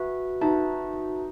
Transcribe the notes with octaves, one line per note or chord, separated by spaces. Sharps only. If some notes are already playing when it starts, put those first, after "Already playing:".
Already playing: F#4 B4 E5 A5
D#4 F#4 B4 E5 A5